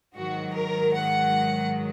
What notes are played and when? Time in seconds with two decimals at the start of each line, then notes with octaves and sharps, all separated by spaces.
0.16 G#2 D#3 F#3 F#4
0.54 A#4
0.94 F#5